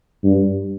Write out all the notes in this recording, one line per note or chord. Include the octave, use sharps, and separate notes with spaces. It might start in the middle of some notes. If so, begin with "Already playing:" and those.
G2